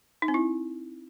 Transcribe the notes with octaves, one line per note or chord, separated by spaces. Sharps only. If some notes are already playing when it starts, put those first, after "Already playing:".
D#4
C4
E4